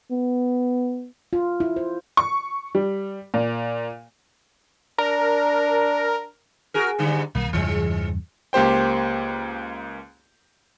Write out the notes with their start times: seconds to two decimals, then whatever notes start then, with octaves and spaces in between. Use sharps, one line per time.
0.11 B3
1.33 F4
1.60 E4
1.76 C5
2.17 C#6
2.75 G3
3.34 A#2
4.98 D4 A#4
6.74 F#4 G#4 A#4
6.99 G#2 D3 G3
7.35 B1 D#3 G3 A#3
7.53 E2 G2 C#3 E3 G#3
8.53 C#2 A#3 G4 C5 G5